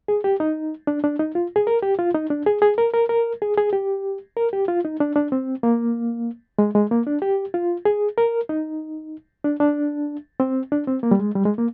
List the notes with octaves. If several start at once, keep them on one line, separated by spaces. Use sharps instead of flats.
G#4
G4
D#4
D4
D4
D#4
F4
G#4
A#4
G4
F4
D#4
D4
G#4
G#4
A#4
A#4
A#4
G#4
G#4
G4
A#4
G4
F4
D#4
D4
D4
C4
A#3
G#3
G#3
A#3
D4
G4
F4
G#4
A#4
D#4
D4
D4
C4
D4
C4
A#3
G3
G#3
G3
G#3
A#3